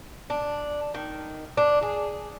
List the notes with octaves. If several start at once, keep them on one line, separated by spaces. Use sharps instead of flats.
D4
D#3
D4
G#4